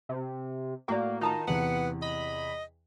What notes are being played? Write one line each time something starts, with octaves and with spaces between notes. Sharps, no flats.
C3
A2 A#3 F#4 D5 G5
D#3 D#4 F4 A5 A#5
E2 C3 E3 B3 F#5
D#5 B5